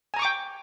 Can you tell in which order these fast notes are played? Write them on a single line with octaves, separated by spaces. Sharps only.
G#5 A#5 C#6 D6 G5